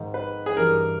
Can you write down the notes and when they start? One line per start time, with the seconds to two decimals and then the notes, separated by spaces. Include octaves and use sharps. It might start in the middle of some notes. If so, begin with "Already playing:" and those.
Already playing: G#2 D#3
0.14 B4
0.46 G#4
0.57 G2 E3 A#4